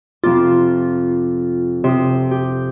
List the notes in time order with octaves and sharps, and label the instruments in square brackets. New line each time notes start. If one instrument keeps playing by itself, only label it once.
[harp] F2 C3 D6 [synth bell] F4
[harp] C3 D#6
G4